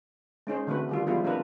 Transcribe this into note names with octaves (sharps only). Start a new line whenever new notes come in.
G#3 C#4 D#4 C5
D3 E3 A3 C4 F#4 B4
D#3 G3 F4
F3 G3 G#3 B3 E4 F4
A#3 C4 D4 A#4 B4